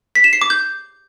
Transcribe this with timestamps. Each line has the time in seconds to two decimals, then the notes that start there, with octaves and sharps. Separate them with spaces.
0.15 B6
0.24 E7
0.33 C7
0.41 D6
0.50 G6